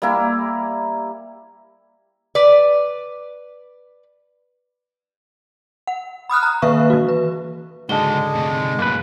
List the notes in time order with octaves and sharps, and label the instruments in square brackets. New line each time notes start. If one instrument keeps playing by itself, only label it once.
[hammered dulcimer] G3 A#3 E4 A#4
[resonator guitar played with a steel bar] B4 D5
[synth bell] F#5
B5 D#6 F6 F#6
A#5
D#3 A#3 B4 E5 F5 C#6
E3 F#4
B4
[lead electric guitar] C#2 F#4 [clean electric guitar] G#2 D3 [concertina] G#3 [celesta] A5 G7
[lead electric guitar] C3 A3
[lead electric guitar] F#2 A2 [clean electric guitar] A#3 B4